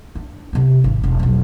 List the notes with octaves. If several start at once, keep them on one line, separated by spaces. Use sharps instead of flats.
D4
C3 B3
G#1
E1
B1 F2